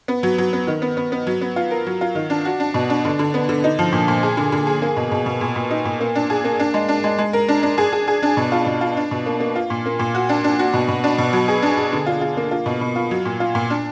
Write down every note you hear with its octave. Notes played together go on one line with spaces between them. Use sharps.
B3
F#3
F#3
B3
D#3
B3
B3
B3
F#3
B3
F4
A#4
F#3
F4
D#3
D4
F#4
D4
B2
D4
D3
D3
B3
D3
D#4
F3
A#2
A#2
G#4
D3
D3
G#4
A#3
B2
B2
B2
A#2
A#2
D#4
A#2
A#3
D4
G#4
A#3
D4
G#3
D4
G#3
G#3
A#4
D4
D4
G#4
G#4
G#4
D4
B2
F4
B2
F4
D4
B2
A#3
A#3
F4
A#2
A#3
A#2
F#4
D4
D4
F#4
B2
B2
D4
B2
F#3
G#4
D4
G#4
D3
F4
F4
A#3
F4
B2
B2
F4
F#3
A#2
F4
A#2
D4